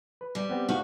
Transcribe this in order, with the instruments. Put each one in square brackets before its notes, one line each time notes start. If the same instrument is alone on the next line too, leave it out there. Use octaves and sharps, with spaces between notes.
[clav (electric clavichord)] B4
[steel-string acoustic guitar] G3
[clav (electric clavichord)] B3 C4 G4
[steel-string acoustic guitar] D2 F#4 F5